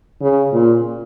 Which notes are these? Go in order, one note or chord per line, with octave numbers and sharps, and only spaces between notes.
C#3
A#2